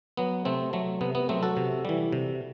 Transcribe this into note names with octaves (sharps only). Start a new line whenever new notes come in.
F#3 B3
C3 A3 C4
F#3 A3
C3 B3
B3
F#3 A3 C4
F#4 A4
C3
E3 G3
C3